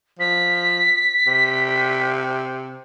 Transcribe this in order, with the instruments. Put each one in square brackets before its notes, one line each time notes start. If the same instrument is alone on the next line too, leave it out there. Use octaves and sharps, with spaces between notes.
[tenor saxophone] F3 [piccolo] B6
[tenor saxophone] C3